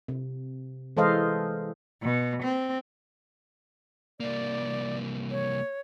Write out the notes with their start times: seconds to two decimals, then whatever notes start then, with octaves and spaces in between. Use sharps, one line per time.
0.08 C3
0.97 E3 G#3 A4 C5 D#5 F5
2.03 B2
2.43 C4
4.20 C2 A#3 D5
5.31 C#5